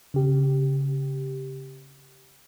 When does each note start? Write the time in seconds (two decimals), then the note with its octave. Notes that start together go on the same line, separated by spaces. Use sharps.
0.14 C#3 G4